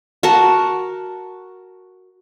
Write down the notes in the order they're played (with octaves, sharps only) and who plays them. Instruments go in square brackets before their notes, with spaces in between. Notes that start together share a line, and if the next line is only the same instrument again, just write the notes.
[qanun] F#4 A#4 A5